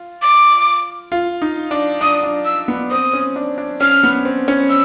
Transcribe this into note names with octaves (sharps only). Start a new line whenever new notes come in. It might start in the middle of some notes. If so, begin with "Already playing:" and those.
Already playing: F4
D6
F4
D#4
D4
D4 D#6
D4
E6
B3
C4 D#6
C#4
D4
D4
C#4 F6
B3
C4
C#4
E6